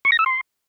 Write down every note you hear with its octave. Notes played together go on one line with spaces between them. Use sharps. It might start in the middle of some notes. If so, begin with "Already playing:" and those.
C#6
A#6
E6
C6